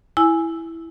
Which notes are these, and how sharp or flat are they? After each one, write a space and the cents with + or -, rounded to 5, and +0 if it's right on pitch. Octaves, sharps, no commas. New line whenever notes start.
E4 +0 G#5 +0